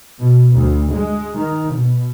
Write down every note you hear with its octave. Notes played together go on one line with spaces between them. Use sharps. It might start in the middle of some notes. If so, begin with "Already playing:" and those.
B2
D2
G#3
D#3
B2